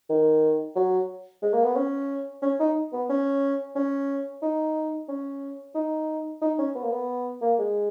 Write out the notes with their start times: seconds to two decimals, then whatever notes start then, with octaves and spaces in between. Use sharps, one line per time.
0.09 D#3
0.76 F#3
1.42 G#3
1.53 A#3
1.64 B3
1.76 C#4
2.42 C#4
2.60 D#4
2.92 B3
3.09 C#4
3.75 C#4
4.42 D#4
5.08 C#4
5.75 D#4
6.42 D#4
6.58 C#4
6.75 B3
6.83 A#3
6.91 B3
7.41 A#3
7.59 G#3